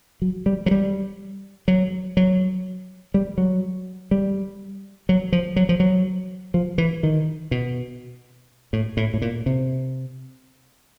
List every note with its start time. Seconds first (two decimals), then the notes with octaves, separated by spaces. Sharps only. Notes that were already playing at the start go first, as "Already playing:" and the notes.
0.22 F#3
0.46 G3
0.66 F#3
0.71 G3
1.68 F#3
2.17 F#3
3.14 G3
3.38 F#3
4.11 G3
5.09 F#3
5.33 F3
5.56 F#3
5.69 F3
5.80 F#3
6.54 F3
6.78 E3
7.03 D#3
7.51 B2
8.73 A2
8.97 A2
9.14 A2
9.22 A#2
9.46 C3